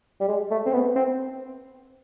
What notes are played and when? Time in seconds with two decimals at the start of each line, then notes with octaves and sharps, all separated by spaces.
0.20 G3
0.28 G#3
0.51 A3
0.66 C4
0.73 B3
0.96 C4